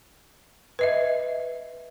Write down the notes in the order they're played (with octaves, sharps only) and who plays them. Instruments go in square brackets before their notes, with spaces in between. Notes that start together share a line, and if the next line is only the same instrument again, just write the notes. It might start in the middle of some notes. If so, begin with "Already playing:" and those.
[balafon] B4 D#5 E5